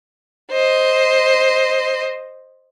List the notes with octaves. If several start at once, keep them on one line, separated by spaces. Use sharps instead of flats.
C5 D#5